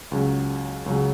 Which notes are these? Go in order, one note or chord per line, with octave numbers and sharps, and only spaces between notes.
C#2 C#3 F#3
C#2 C#3 F#3